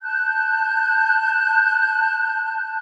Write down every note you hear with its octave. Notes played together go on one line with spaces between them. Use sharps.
A5 F#6 G6